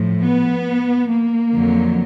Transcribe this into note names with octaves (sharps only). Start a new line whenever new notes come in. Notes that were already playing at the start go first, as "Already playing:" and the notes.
Already playing: A2 F3
B3
A#3
F2 D3 F#3